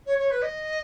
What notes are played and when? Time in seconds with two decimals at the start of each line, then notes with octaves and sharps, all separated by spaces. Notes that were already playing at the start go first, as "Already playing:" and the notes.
0.06 C#5
0.18 C#5
0.31 B4
0.42 D#5